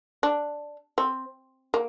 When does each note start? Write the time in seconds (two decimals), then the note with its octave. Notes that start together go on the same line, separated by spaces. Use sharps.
0.23 D4
0.98 C4
1.74 A#3